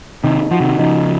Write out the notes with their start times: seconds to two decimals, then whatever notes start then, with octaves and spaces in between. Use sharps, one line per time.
0.24 C3 D#3 D#4
0.51 F3 F#4
0.60 C3 D#3
0.78 C#3 F3 D#4